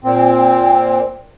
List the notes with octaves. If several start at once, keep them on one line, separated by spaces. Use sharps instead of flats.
A#2 C4